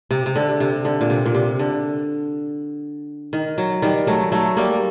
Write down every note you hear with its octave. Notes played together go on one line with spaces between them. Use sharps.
C3
C3
D3
C3
D3
A#2
C3
A#2
C3
D3
D#3
F#3
D#3 G3
F#3 A3
F#3 A3
G3 A#3